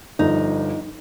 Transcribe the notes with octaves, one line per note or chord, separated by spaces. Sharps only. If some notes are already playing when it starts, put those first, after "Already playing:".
G1 F3 D#4